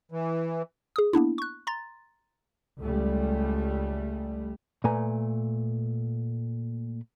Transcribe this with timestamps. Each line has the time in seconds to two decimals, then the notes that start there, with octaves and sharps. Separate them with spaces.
0.12 E3
0.96 G#4 D#6
1.13 A#3 B3 D4 E4
1.38 C#6 F#6
1.67 A#5 C6 A6
2.79 C#2 G3 A3
4.84 A#2 A3 B4 G#5 A#5